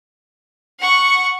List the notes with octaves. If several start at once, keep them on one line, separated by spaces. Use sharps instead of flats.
F#5 C#6